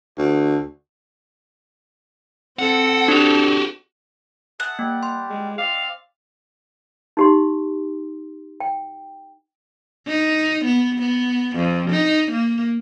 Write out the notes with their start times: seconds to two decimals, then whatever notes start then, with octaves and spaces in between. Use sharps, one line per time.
0.18 D2
2.59 C4 A4 F#5
3.08 D4 F#4 G4
4.60 G#4 E5 F#5 A5
4.79 G3 A#3 G4
5.03 C6
5.30 G#3
5.58 C4 D5 F5
7.17 D#4 G4 C6
8.60 G5
10.08 D#4
10.65 B3
10.99 B3
11.56 F2
11.91 D#4
12.32 A#3